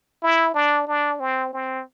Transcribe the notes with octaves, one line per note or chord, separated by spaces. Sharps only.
E4
D4
D4
C4
C4